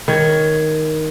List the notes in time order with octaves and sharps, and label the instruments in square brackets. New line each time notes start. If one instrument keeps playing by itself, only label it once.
[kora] D#3 C#5